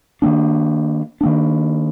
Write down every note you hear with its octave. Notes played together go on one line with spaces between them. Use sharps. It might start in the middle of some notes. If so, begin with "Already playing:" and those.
D#3 A#3 D4
D#3 A#3 D4